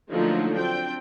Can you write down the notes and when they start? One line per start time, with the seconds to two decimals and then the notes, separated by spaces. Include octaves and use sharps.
0.11 D3 F3 F#3 A3 A#3 D#4
0.58 C4 D4 G5